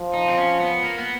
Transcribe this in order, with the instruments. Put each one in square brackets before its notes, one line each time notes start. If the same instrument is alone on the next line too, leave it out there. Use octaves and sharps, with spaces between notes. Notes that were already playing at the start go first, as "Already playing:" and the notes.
Already playing: [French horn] F3
[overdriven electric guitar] D#4
C4
C#4
B3
A#3
B3